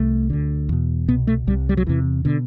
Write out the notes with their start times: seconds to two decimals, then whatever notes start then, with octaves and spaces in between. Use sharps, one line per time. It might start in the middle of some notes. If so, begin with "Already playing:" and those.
Already playing: C2 C3 A3
0.30 D2 D3
0.69 E2 B2
1.08 C2 B2 B3
1.27 A3
1.47 C2 G3
1.51 C3
1.69 G3
1.77 F#3
1.86 E2 C3 E3
2.25 B2 D3